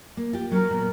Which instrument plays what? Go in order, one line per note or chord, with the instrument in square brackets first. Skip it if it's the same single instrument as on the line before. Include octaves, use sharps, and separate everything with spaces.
[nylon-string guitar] A#3
F4 G4
[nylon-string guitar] F#3 C#4 [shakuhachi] A#4
[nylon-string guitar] A#2 B3